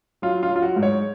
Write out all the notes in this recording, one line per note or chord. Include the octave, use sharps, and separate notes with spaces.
F#3 F4
F4
F#3
F4
F#4
G#2
C#5